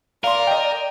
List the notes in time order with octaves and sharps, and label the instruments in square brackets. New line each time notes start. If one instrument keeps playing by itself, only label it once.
[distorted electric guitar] A#4 [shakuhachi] D5 [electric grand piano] F5 C6
[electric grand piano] D#5 G5